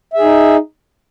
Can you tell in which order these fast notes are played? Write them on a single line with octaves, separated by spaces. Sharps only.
E5 G#4 D#4